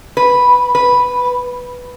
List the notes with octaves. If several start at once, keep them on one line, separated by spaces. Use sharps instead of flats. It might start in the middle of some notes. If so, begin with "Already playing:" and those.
B4
B4